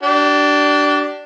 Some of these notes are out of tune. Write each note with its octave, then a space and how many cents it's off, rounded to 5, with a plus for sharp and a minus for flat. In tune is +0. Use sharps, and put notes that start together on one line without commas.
D4 +0 G4 -35